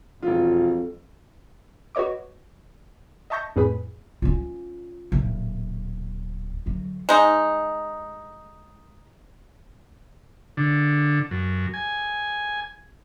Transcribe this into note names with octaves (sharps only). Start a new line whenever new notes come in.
E1 F2 F4
F#4 B4 C#5 D#5 D6
D#5 E5 A5 C#6 G6 A#6
F2 A2 G#4 B4 B5
C#4 F4
D1 A#2
D2 F#3
G#3 D#4
D3
F#2
G#5